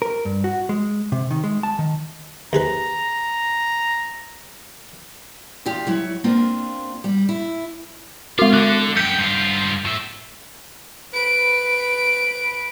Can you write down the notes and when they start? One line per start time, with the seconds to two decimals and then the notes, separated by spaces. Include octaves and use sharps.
0.02 A#4
0.25 G2
0.44 F#4
0.69 G#3
1.12 C3
1.31 D#3
1.44 G#3
1.63 A5
1.79 D#3
2.53 D#2 G#4 B4 A#5
5.66 E2 F4 G4 D5 F5
5.87 F#3 E4 C#5
6.24 A#3 C4 D4 F4
7.04 G3
7.29 E4
8.39 G#3 F4 F#4
8.53 D3 F#6
8.97 F#2 G5 G6 B6 C#7
9.19 G2 F4
9.85 A2 E5
11.13 B4 D7